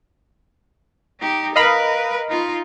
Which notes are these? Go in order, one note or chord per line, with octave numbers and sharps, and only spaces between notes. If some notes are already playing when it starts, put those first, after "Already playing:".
D#4 G4
A#4 B4 D#5 F5 B5
D#4 F4